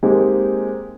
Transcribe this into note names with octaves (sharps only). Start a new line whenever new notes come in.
G#3 A#3 C4 D#4 G4